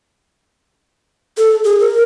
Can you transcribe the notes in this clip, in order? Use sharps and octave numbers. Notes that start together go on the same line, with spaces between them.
A4
G#4
A#4